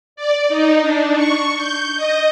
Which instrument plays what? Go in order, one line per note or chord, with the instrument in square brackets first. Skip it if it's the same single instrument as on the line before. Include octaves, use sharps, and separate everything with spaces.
[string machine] D5
D#4
D4
C#6
G6
D#5